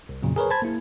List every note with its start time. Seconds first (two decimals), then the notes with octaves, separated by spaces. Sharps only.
0.09 C2
0.22 F2 A#2 C#3 F#3
0.36 G#4 A#4 B4 C#5
0.50 C5 A5 B5 G#6
0.62 A#3 E4